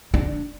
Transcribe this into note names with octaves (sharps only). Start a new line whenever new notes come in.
D4